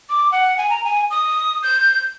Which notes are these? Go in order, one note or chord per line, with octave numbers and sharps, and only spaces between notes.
D6
F#5
G#5
A#5
G#5
D#6
G6